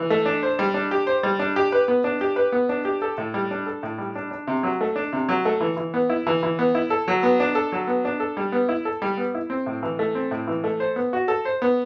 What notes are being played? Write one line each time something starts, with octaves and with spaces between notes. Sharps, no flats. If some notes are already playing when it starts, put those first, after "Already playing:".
Already playing: E3
A3
D4
C5
G3
D4
G4
C5
G3
D4
G4
B4
B3
D4
G4
B4
B3
D4
G4
A4
A2
G3
D4
A4
A2
G3
D4
D4
C3
F#3
A3
D4
C3
F#3
A3
E3
E3
B3
E4
E3
E3
B3
E4
A4
F#3
B3
D4
A4
F#3
B3
D4
A4
G3
B3
E4
A4
G3
B3
E4
C4
A2
E3
A3
C4
A2
E3
A3
C5
B3
F#4
A4
C5
B3